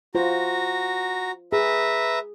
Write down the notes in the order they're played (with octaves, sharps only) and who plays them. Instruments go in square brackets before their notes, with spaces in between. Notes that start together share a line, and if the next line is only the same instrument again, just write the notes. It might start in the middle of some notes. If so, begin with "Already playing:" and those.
[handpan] F4 C5 [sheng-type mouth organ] F#4 A#5
[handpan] G#4 [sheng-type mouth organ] B4 E5 A#5